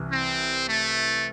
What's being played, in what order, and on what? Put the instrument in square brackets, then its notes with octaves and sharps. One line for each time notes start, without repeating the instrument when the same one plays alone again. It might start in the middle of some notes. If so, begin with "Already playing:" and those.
Already playing: [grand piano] C2 C3 E3
[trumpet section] C4
A3